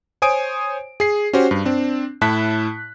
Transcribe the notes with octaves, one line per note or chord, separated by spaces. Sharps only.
C5 C#5 G#5 D#6 D7
G#4 C7
C#4 F#4 G4 C5
G2
C4 D4
A2 E4 A5 F#6 B6